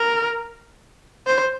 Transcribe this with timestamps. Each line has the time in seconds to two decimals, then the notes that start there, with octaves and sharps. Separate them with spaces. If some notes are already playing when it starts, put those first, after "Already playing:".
Already playing: A#4
1.27 C5